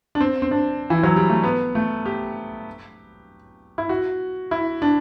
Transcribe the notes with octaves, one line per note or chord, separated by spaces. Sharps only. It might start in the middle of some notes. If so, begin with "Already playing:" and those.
D4
C4
C4
D4
E3
F#3
G3
A3
B3
A3
G4
E4
F#4
E4
D4